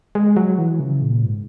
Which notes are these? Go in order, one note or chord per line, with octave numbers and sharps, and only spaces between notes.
G#3
F#3
E3
C#3
A#2
G#2